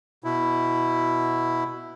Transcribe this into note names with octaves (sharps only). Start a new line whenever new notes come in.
B2 E4